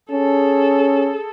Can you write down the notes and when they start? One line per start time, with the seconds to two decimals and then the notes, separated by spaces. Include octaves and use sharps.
0.12 C#4 G#4 A4